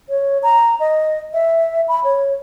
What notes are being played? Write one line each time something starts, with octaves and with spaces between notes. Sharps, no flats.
C#5
A#5
D#5
E5
B5
C#5